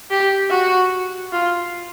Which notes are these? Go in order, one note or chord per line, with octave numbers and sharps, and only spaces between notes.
G4
F#4
F4